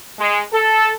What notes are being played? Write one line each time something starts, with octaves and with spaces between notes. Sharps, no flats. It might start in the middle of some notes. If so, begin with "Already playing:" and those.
G#3
A4